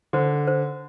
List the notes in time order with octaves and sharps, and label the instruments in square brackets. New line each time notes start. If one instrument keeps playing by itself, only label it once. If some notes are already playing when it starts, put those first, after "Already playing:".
[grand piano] D3 [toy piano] C5
[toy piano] C5